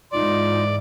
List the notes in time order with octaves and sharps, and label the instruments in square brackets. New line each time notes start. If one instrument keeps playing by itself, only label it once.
[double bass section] G#2 E3 [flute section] D#4 F4 C6 [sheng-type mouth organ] D5